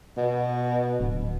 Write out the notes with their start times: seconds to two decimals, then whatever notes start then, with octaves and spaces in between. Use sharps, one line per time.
0.17 B2
1.00 D1